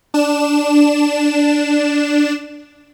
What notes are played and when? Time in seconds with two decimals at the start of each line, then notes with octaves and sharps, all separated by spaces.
0.14 D4 E7